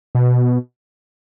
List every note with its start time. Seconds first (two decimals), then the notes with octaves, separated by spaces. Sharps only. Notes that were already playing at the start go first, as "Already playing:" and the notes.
0.15 B2